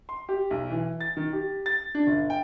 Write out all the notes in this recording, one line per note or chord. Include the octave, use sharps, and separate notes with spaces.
C6
G4
B1
E3
A6
D#3
G4
A6
D4
G1
G5